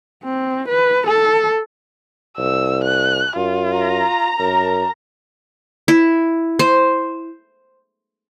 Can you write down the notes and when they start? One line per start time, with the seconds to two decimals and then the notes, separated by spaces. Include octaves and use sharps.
0.23 C4
0.68 B4
1.06 A4
2.38 C2 E6
2.83 F#6
3.36 F#2 F4
3.77 A#5
4.39 F#2 A#4
5.88 E4
6.59 C5